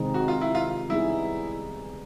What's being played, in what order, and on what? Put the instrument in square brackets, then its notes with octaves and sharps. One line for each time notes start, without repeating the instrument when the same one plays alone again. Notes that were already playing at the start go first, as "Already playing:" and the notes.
Already playing: [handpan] C3 D#3 G#3 C4 D#4
[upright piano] F#4
F4
E4
F4
[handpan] G3 B3 D#4 G#4 [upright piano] E4